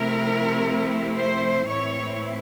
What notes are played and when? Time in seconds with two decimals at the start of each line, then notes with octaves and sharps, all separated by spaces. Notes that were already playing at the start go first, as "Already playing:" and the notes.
Already playing: C3 F3 A3 C4 E4 A#4
1.14 C5
1.67 A2 E3 A3 C4 E4 C#5